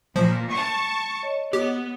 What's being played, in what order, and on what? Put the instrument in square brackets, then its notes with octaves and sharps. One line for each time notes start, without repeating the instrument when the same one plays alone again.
[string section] A#2 [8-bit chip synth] F3
[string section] A5 C#6
[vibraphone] C#5 D#5
[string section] B3 [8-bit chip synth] G4